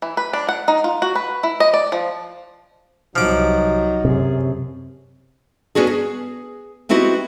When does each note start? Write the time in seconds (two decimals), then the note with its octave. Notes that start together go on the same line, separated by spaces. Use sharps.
0.02 E3
0.17 B4
0.33 D4
0.49 F#5
0.68 D#4
0.84 F4
1.02 F#4
1.15 B4
1.43 E4
1.60 D#5
1.74 D5
1.92 F3
3.16 C2 F3 F#3 D#4 F#4 D6
4.05 F#2 C3 G#4
5.75 B3 C#4 D4 F#4 G#4
5.87 G#4
6.89 B3 C4 D#4 E4 F#4 G4